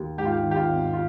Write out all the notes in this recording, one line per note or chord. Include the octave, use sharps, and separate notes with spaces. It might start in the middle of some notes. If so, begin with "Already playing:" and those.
Already playing: D#2
G#2 G4
F4
G4
D#3
G4
F4
G#1
F4